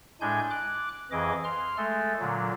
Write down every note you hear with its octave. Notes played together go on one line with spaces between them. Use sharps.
A2 G#3 D4 G#5 G6
D6 F#6
F2 E3 G#4 D#5 D6
C6 F6
G#3 A3 A4
A#2 D3 F#3